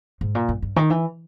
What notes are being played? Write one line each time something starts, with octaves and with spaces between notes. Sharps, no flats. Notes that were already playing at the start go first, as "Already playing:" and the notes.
G#2
A#2
G2
G2
D#3
E3